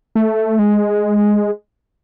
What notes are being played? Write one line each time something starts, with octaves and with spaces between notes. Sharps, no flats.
A3
G#3